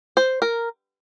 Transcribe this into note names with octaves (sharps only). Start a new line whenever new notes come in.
C5
A#4